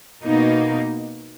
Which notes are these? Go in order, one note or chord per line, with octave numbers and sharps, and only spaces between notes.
B2 A#3 D#4